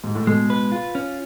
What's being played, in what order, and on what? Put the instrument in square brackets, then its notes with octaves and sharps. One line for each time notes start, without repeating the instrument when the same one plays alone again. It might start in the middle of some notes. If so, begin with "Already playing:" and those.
[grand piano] G#2
A2
[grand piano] B2 [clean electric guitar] G#3
[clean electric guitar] B4
F4
C#4